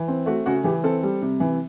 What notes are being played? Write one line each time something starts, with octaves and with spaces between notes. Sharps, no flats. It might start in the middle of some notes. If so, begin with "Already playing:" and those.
Already playing: E3
C4
A3 F#4
C#3 F#4
E3 G4
C4 A4
G3
C3
E3